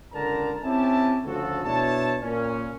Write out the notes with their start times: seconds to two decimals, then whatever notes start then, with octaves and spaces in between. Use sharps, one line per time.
0.13 C#2 D3 A#4 A5 A#5
0.63 C4 C#4 E4 G4 G#5 A5
1.25 D2 C#3 F3 F#4 A4
1.66 B2 D4 E4 C#5 A5
2.23 A#2 C#4